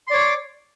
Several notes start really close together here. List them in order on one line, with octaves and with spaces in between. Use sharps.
C6 D5 C#5 D6